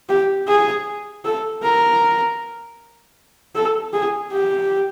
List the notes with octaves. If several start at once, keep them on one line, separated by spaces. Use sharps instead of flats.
G4
G#4
A4
A#4
A4
G#4
G4